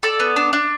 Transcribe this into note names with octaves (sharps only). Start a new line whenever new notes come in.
A4 D5
B3
D4
D4